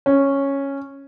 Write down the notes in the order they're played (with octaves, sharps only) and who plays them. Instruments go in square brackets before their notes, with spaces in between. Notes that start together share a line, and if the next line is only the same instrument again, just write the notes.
[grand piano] C#4